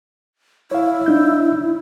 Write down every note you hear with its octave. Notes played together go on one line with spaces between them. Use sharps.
E4 C#5 F5
D4 D#4 G6